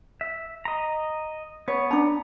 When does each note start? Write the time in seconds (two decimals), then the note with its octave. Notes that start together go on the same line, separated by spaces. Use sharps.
0.21 E5
0.65 D#5 A#5
1.68 B3 C#5
1.91 D4 A#5